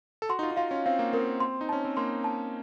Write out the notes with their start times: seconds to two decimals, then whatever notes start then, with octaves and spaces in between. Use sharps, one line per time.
0.22 A4
0.29 F#4 C6
0.39 D#4
0.43 F4
0.51 D#4
0.57 F4 F5
0.71 C#4
0.86 C4 F5
0.99 A#3
1.13 C4 A#4
1.40 C6
1.61 D#4
1.69 C#4 A5
1.85 C4
1.97 A#3 C6
2.24 A5